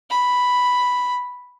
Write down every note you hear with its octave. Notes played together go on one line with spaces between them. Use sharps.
B5